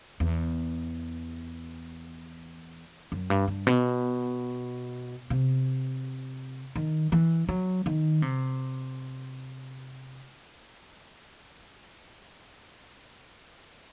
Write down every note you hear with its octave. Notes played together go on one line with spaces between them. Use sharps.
E2
F#2
G2
G2
B2
C3
D#3
E3
F#3
D#3
C3